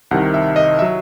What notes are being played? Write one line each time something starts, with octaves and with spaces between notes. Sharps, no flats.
C2 C3 D#3 F#5
E5
D#5
E5
F#3